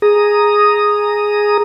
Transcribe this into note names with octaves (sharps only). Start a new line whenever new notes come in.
G#4 A#5 D#6